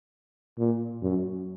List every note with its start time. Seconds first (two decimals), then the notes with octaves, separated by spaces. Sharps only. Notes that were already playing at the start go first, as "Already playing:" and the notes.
0.58 A#2
1.02 F#2